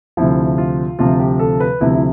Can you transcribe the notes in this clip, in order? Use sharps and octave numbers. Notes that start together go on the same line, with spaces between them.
D2 C3 F3 E4
F4
D2 C3 F3 F4
G4
A4
B4
D2 C3 F3 E4
E4